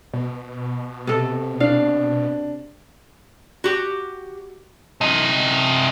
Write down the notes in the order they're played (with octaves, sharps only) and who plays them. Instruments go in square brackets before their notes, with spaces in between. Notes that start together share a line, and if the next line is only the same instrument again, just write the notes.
[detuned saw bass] B2
[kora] C3 A4
[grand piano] D4 [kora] F5
[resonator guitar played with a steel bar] F#4 G4
[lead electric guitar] C3 D#5